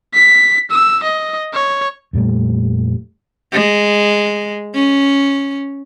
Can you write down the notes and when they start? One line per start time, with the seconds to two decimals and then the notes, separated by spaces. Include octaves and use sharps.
0.14 B6
0.71 E6
1.03 D#5
1.53 C#5
2.13 F2 A#2 G3 A3
3.53 G#3
4.75 C#4